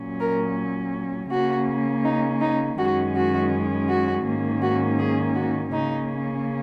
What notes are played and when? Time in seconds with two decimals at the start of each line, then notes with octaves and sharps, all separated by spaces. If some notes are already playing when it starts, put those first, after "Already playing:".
Already playing: A#2 F#3 C#4
0.20 A#4
1.31 C#3 A#3 C#4 F#4
2.04 D#4
2.41 D#4
2.77 F#2 D#3 G#3 C#4 F#4
3.15 F#4
3.88 F#4
4.25 G#2 D#3 A#3 C#4
4.62 F#4
4.98 G#4
5.35 F#4
5.72 C#3 A#3 C#4 D#4